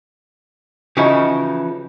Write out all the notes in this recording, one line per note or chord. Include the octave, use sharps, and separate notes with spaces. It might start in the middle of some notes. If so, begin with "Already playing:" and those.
C#3 E3 F3 D#4 E4 F#4